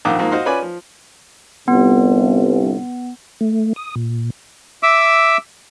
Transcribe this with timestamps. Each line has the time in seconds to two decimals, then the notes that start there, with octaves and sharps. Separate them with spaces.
0.05 A#1 F2 D#3 F#5 D6
0.19 F2 G#2 A#3
0.32 F#4 C5 D#5 F5 F#5 C6
0.46 C#4 F4 B4 D5 G#5
0.62 F3
1.68 G1 C2 B3
3.41 A3
3.76 D#6
3.96 A#2
4.83 E5 D6 E6